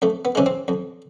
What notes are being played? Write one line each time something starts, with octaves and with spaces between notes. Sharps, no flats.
F2 A3
B3
C3 E3 G#3 C#4
C4
F2